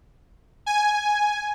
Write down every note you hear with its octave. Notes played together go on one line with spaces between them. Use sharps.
G#5